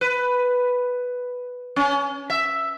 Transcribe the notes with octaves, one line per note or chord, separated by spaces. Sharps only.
B4
C#4
E5